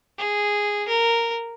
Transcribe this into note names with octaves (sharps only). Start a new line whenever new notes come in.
G#4
A#4